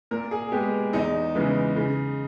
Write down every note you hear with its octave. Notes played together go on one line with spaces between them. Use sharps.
A#2 A#4
G#4
G#3 B3 G4
E2 D#4
C#3 E3 G#3 B3
C#3